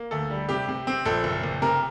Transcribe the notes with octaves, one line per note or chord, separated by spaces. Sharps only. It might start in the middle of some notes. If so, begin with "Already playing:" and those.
Already playing: A#3
D2 A4
G3
C3 G4
C3
C4
A#1 A4
F#1
F#1
C3 A#4